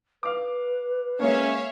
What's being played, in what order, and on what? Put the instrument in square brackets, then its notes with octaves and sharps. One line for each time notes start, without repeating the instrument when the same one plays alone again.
[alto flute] B4 [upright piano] F5 D6
[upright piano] G#3 A#3 [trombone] C#4 [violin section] C#5 E5 F5